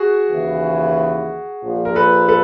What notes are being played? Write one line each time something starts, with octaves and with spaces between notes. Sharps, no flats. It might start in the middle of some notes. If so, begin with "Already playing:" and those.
Already playing: F#4 G#4
D#2 C#3 E3
A#1 A#2 F3 A#3
A#4
A4 B4
A4 B4